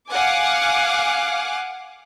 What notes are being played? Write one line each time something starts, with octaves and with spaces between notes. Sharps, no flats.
F5 F#5 G#5 D6